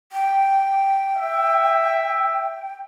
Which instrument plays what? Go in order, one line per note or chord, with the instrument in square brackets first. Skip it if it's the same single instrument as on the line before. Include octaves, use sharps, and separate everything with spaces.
[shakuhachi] G5
[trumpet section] E5